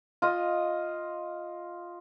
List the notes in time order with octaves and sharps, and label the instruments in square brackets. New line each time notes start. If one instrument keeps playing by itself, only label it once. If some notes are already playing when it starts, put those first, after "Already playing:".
[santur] F4 D#5